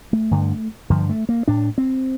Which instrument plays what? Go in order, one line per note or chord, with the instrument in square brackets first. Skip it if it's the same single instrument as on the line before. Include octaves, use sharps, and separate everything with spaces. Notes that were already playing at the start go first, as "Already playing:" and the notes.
[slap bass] A3
G2 D3
G2 D3 F3
A3
A#3
A2 D4
C4